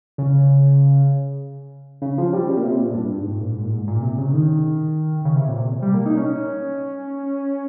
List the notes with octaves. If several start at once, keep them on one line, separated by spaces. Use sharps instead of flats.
C#3
C#3
F3
G3
C#3
A#2
C3
A#2
G2
G#2
A#2
G#2
A#2
G#2
A#2
C3
C#3
D#3
C#3
C3
A#2
C3
G3
A#3
D#4
C#4